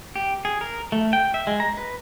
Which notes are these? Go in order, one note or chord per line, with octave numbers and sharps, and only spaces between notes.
G4
G#4
A#4
A3
G5
E5
G#3
A#5
B4